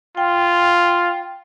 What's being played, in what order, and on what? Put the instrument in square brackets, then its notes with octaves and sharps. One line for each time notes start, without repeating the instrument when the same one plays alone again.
[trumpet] F4 [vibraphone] G5